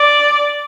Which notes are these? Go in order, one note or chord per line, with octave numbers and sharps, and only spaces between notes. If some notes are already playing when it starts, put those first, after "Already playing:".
Already playing: D5